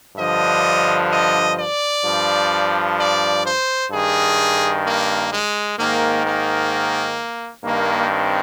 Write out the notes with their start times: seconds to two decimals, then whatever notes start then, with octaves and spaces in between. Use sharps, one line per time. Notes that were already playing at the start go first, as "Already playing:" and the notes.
0.16 G2 D3 F3 D#5
1.10 D#5
1.57 D5
2.04 G2 F3
2.97 D5
3.43 C5
3.90 G2 D#3 G#4
4.84 A#3
5.31 G#3
5.77 G#2 D#3 A#3
6.24 A#3
7.64 G2 D#3 A#3
8.11 C4